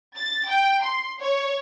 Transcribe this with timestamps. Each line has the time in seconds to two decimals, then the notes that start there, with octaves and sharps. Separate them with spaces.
0.17 A6
0.48 G5
0.82 C6
1.20 C#5